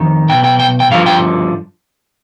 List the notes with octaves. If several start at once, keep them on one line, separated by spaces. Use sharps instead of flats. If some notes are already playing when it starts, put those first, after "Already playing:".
Already playing: F2 D#3
B1 B2 G5
G5
G5
G5
G2 D3 F3 F5
G5